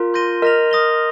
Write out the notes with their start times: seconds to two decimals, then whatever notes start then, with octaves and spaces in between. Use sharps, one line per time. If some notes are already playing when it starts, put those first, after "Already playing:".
Already playing: F4 A#4
0.14 C6 G6 A#6 D#7 G7
0.42 A#4 D#5 F6 A#6 F7
0.71 D#6 A#6 G7